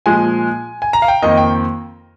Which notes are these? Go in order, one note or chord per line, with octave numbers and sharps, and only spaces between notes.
A#2 F3 G#3 G#5
G#5
A#5
F5
G5
F2 D#3 A#3 D#5
G5